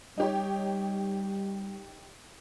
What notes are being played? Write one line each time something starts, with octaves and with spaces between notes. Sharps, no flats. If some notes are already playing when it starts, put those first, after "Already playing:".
G3 D#4 G4 C#5